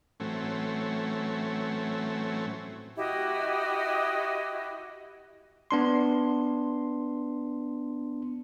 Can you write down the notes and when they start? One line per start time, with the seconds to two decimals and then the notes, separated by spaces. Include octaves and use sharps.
0.20 A2 E3 F#3 A3 C4 C#4
2.97 E4 F#4 G4 D#5
5.71 B3 D4 C6